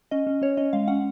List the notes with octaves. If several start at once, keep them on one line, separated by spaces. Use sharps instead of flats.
C#4 D#5
C#4
C#4 C#5
C#4 D#5
G#3 F5
C#4 F#5